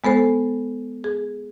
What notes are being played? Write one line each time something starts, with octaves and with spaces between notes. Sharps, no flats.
G#3 B3 A4 C5
G#4